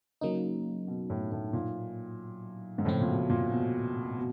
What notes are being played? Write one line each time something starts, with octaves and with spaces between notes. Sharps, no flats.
C#3 F#3 A#3 D#4
B2
A2
A2
A#2
G#2
A2 C#3 F3 A3 C4
A#2
B2
A#2
B2
B2